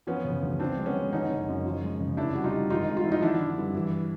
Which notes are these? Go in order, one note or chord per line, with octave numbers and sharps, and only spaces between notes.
F3 B3 C#4
C#3
D2
F3 C4 D4
G#3
B3 C#4
G#3
D3 C#4 D#4
F#1
F#2
F3
G#3
C#3
F1 D4 E4
G3 F#4
D#4 F4
G3
G#1 D#4 F4
G#3
F4
F3 E4
D#4 F4
D3 D4 E4
D3
G2
E3